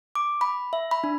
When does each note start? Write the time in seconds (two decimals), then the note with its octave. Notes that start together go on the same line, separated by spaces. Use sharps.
0.15 D6
0.41 B5
0.73 E5
0.91 B5
1.04 D4